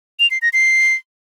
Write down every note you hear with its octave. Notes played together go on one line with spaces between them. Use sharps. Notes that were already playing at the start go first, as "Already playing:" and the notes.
F7
C7
A#6
C7